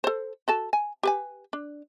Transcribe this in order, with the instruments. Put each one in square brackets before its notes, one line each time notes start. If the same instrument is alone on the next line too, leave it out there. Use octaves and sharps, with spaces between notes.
[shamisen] A4 C5
F#4 A4 A5
G#5
G4 B4 G#5
D4